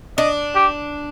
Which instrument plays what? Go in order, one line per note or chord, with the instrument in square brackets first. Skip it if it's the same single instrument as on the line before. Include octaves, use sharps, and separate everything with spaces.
[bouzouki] D4 [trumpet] D#5
[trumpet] G4